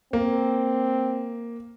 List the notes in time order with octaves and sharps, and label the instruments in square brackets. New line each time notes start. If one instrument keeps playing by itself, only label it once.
[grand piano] A#3 [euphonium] C4